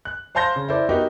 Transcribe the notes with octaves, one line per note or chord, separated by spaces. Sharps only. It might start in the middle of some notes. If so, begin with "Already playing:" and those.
F#6
C5 F5 A5 C6 G6 A#6
C#3
E4 A4 C5 D5
B3 D#4 F#4 G4 A#4